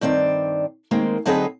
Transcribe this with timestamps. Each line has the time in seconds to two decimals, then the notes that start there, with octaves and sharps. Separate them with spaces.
0.01 G2 D#3 C4 D5
0.91 D#3 G#3 A#3 C4
1.26 D3 F#3 C4 D#4 G#4 B4